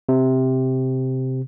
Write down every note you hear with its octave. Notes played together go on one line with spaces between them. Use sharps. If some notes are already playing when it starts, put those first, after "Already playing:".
C3